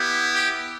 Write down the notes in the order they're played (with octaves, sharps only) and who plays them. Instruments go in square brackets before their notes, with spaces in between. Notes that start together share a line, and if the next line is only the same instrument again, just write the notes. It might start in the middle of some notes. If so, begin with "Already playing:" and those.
Already playing: [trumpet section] B3 E4 G4
G4